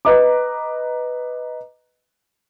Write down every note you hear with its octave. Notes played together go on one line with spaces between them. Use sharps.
B4 D#5 A#5 D6